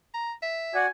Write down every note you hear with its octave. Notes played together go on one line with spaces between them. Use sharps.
A#5
E5
F#4 D5 F#5 G#5